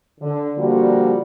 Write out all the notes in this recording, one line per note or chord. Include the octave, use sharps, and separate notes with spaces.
D3
D3 F3 G3 A#3 F4 F#4